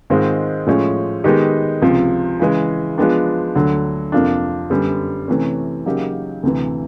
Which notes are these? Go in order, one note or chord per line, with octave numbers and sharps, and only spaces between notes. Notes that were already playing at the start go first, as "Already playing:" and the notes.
G#2 D#3 G#3 C4 F4
A2 F3 G#3 C#4
D#3 G#3 B3 D#4 G4
C#2 C3 F3
C#3 E3 G#3
F3 G#3 B3 D4
D2 D3 F#3
F2 C3 F3 A#3 D4
F#2 D3 G3 B3
C3 E3 A3 C#4
C#3 F#3 A#3 D#4 G4
D2 C3 E3